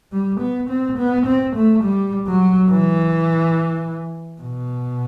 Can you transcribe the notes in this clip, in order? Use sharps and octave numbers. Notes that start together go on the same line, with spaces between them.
G3
B3
C4
B3
C4
A3
G3
F#3
E3
B2